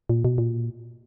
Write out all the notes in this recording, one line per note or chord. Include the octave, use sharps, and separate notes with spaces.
A#2
B2
A#2